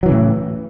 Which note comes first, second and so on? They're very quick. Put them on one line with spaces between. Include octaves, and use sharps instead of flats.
F#3 E3 C#3 A2